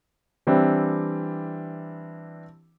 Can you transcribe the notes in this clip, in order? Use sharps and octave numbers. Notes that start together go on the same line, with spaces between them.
E3 G3 C4 D4 E4